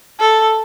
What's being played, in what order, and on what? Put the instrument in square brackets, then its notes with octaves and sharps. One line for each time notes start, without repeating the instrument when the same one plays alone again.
[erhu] A4